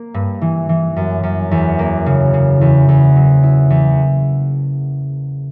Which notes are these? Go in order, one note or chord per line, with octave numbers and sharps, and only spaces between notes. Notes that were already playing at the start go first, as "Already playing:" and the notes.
Already playing: A#3
G2
E3
E3
F#2
F#2
E2
A#3
C#3
C#3
E2
E2
F#3
E4
E2